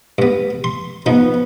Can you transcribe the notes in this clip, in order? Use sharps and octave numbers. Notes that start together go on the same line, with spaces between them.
G2 B3
C6
F3 B3 D#4